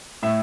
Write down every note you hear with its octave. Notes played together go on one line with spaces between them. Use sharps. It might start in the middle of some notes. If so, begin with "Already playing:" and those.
A2 E5